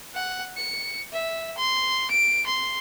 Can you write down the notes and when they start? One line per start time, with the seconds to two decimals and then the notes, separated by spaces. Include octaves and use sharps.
0.15 F#5
0.57 C#7
1.12 E5
1.57 C6
2.11 D7
2.46 C6